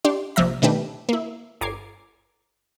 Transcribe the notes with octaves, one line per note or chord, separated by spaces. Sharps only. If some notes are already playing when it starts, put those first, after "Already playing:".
D4 G4 D5 C6
A#1 C3 F3 E5 A#5
B2 D#3 A3 D4 G4 B4
A#3 E4
G1 A#5 D6 G#6 C7